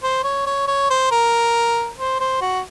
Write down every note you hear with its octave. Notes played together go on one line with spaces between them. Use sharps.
C5
C#5
C#5
C#5
C5
A#4
C5
C5
F#4